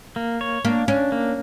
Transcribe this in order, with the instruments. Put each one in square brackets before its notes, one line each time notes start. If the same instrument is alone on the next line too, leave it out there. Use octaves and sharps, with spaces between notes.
[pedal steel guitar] A#3
C#5
[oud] A#3 [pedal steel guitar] D4
[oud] C#4 [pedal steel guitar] D4
[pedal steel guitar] A#3